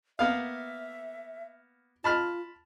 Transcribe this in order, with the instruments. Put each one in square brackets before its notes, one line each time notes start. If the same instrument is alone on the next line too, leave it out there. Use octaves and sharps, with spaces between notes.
[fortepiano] A#3 B3 F5 [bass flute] E5
[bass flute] F4 [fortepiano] A5 B5 F6